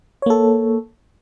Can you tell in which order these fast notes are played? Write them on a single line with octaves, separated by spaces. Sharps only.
C#5 A#3 A4